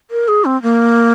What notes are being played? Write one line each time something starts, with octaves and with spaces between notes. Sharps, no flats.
A#4
G#4
C4
A#3